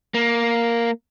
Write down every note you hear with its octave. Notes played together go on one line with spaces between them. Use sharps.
A#3